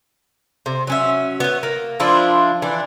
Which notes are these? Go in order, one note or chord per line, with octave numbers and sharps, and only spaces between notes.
C3
F#3 C#4 E5
B3 C#5
A#3
F3 D4 E4 F4
E3 D4